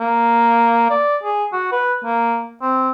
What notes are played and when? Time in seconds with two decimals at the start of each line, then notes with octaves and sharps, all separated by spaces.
0.01 A#3
0.90 D5
1.24 G#4
1.53 F#4
1.72 B4
2.04 A#3
2.62 C4